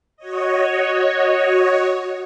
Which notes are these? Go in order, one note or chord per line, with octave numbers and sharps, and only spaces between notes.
F#4 C#5 D#5